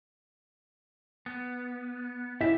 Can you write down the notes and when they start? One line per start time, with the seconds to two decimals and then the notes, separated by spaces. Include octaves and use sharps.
1.26 B3
2.41 C#3 E4 G4 E5